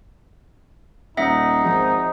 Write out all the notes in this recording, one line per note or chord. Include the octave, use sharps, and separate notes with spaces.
D#1 D#4 E5 F#5 D#6 A#6
G#1 F3 G#4